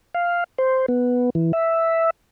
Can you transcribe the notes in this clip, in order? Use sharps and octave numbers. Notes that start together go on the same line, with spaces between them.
F5
C5
B3
E3
E5